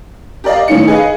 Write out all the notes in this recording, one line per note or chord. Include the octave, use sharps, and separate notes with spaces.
G4 A#4 D5 D#5 F5
A2 D#3 C#4 D#4 C#7
G#4 B4 D#5 F5